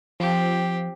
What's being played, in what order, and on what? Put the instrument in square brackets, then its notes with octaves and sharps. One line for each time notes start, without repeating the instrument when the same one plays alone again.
[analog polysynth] F3 [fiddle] C4 G4